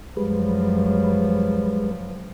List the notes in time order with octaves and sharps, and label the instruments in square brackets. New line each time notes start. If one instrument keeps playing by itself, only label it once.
[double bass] F#2 F3 [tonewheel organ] G3 G#3 B4